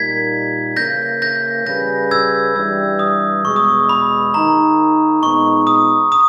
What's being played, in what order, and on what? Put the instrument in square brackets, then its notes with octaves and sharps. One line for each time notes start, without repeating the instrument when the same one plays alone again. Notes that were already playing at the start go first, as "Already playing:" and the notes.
Already playing: [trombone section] A#2 G3 A#3 D#4 A#4 [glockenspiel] G#6 B6
[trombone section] C#3 E3 A#3 [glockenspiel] G6 A#6
[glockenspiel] G6 A#6
[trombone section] C#3 G3 C#4 G#4 B4 [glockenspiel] G6 A#6
[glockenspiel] E6 G#6
[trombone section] G2 E3 G3 [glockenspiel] E6
[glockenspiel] D#6
[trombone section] E2 B2 G#3 [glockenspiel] C#6
[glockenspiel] D#6
C#6
B5
[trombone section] D#3 A#3 D#4 G#4 [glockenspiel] A#5
[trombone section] A#2 G#3 B3 D#4 [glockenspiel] C#6
[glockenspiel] D#6
D#6